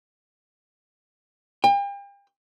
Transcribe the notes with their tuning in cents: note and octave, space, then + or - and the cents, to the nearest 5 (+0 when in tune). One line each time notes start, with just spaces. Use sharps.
G5 +40